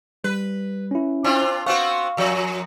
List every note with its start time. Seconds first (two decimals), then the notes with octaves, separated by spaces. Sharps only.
0.24 G3 B4
0.91 C#4 E4
1.24 C4 D4 F4
1.66 B3 C4 F#4 F5 C#6
2.17 F#2 F3